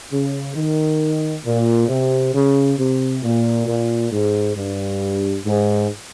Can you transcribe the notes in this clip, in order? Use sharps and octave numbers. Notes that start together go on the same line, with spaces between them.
C#3
D#3
A#2
C3
C#3
C3
A#2
A#2
G#2
G2
G#2